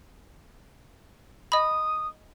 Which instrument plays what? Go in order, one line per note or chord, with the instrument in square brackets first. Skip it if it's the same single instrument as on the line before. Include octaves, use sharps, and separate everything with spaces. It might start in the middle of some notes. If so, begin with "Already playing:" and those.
[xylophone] D#5 B5 [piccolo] D#6